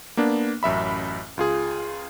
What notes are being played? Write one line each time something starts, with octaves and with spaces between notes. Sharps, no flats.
A#3 B3 D4
A1 F#2 E5 B5
C#2 F4 G#4